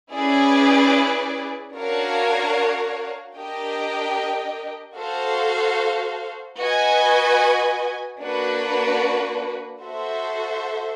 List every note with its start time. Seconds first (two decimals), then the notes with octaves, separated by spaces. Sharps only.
0.13 C#4 E4 G#4 B4 D5
1.75 D4 F#4 A#4 C#5 F5
3.36 D4 G4 A#4 D#5 G5
4.96 F#4 A4 C5 F5
6.58 F#4 B4 D#5 G#5
8.20 A#3 D4 F#4 B4
9.80 F#4 A4 C5 E5